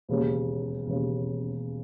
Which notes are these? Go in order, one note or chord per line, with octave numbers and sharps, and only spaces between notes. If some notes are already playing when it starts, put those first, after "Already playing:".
E1 D#2 C#3
E1 D#2 C#3